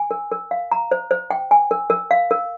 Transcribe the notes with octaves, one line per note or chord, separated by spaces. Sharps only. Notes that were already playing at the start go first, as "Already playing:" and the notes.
Already playing: G#5
A#4
A#4
F5
A#5
C5
C5
G5
G#5
A#4
A#4
F5
A#4